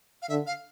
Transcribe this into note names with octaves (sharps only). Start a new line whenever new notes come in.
F5
D3 E5
F5